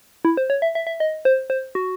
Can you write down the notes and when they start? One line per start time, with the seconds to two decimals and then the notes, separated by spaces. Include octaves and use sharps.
0.25 E4
0.37 C5
0.50 C#5
0.62 E5
0.75 E5
0.87 E5
1.00 D#5
1.25 C5
1.50 C5
1.75 F#4